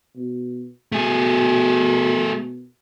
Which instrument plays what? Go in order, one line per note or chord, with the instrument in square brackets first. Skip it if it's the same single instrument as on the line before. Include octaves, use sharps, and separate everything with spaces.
[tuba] B2
[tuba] B2 [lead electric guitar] A3 G#4